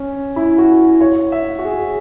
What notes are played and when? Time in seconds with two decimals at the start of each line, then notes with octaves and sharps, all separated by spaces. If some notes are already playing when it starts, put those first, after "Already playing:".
Already playing: C#4
0.36 E4
0.58 F#4
1.01 C#5
1.32 E5
1.59 F#4
1.65 G#4